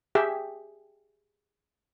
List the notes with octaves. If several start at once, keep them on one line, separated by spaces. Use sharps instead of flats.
G4 G#4 E5 G5